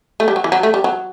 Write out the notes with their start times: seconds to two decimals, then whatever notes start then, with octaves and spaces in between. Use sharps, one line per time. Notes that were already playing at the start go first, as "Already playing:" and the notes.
0.20 A3
0.28 G3
0.36 F#3
0.44 E3
0.52 F#3
0.63 A3
0.74 G3
0.84 F#3